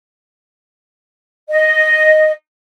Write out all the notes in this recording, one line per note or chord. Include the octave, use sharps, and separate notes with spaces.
D#5